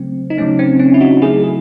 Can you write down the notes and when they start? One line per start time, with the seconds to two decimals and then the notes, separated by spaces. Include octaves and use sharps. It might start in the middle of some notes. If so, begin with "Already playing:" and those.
Already playing: C#3 F#3 A3 C4
0.30 D#4
0.37 C#3 F#3 A3 C#4
0.59 C4
0.79 C#4
0.94 E4
1.01 D#4 F#4
1.22 C#3 F#3 A3 E4 G#4
1.44 G#4